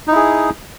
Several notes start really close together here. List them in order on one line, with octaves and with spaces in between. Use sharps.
D#4 E4 G#4